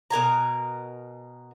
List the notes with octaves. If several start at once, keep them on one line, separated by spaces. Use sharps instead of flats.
B2 A#4 G#5 A#5